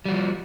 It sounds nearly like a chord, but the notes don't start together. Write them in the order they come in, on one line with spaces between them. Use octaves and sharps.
G3 F#4 F3